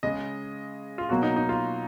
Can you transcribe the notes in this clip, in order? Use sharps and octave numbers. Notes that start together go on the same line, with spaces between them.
C#3 G#3 D#5
F4
B2 F#3 A#3 F#4
D#4
D#4
F4